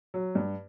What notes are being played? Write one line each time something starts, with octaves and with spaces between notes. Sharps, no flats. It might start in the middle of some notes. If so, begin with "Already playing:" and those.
F#3
G2